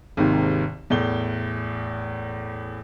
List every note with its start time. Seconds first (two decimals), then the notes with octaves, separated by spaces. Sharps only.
0.17 G#1 D#2 G#2 C3 D#3
0.90 E2 A2 G7